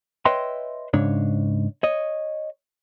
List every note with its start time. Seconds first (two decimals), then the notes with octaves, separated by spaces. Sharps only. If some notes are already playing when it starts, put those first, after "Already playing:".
0.25 B4 C#5 D#5 E5 G5 C6
0.94 G#2 C#3 D4 C#5
1.83 C#5 D#5